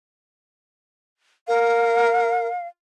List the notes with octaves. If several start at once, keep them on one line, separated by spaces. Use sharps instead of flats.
A#4 F5